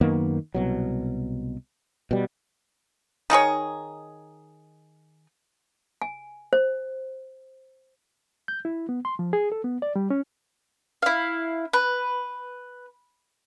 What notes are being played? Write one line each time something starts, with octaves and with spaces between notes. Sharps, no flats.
F#2 D#3 A#3 B3
C2 B2 F#3
B2 G3
D#3 D#4 G#4 C#5
G#5
C5
G6
E4
B3
C6
F3
G#4
A4
B3
D5
G3
C#4
E4 F5
B4